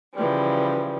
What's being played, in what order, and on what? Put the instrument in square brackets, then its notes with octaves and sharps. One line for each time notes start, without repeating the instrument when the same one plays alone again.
[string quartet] C#3 E3 F3 G3